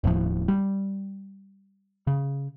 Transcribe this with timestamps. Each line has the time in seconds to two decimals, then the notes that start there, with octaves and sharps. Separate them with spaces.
0.04 D#1 D#2 A2 F3
0.48 G3
2.07 C#3